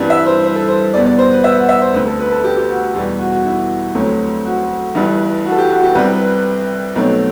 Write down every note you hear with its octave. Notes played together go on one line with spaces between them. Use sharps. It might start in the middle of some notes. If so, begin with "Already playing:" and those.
Already playing: G2 E3 G3 C4
E5
C5
C5
A4
C5
E2 B2 G3 B3 D5
D5
C5
B4
E5
F#5
E5
C5
D2 D3 A3 C4 B4
A4
B4
A4
G4
G4
F#4
E2 B2 G3 G4
F#4
F#4
E4
D2 C3 F#3 A3 C4
F#4
G1 G2 E3 G3
F#4
A4
G4
F#4
G4
C2 C3 G3 C4 B4
B4
B1 B2 F#3 A3 C4